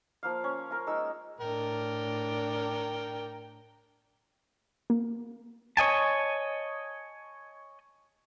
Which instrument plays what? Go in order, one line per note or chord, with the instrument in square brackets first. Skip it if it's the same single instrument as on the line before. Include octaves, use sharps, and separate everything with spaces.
[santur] F3 A#3 F5
C#4
F4 A#4
G#3 D#4 F#5 E6
[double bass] A2 D4 [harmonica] A#4 G5
[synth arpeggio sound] A#3
[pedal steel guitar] C#5 D#5 G#5 A5